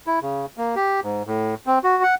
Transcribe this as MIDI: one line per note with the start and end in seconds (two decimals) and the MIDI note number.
0.07 0.19 64
0.22 0.46 49
0.58 0.75 58
0.76 1.00 67
1.04 1.23 44
1.27 1.55 45
1.67 1.79 60
1.84 2.03 66
2.03 2.15 78